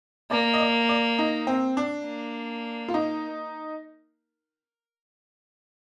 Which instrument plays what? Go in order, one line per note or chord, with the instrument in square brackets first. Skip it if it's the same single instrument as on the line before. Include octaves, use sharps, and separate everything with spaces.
[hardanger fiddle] A#3 [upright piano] D5
[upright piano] D#5
D5
D5
D#4
C4
D4
[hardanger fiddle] A#3
[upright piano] F4
D#4